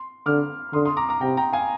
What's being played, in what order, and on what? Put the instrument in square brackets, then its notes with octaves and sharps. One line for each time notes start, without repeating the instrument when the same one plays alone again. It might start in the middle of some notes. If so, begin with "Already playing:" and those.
Already playing: [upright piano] C6
[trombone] D3 [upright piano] D6 F6
[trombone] D3 [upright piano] C6 D#6
[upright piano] C6 D#6
A#5 D6
A#5 D6
[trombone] C3 [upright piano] G5 A#5
[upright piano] G5 A#5
F5 G#5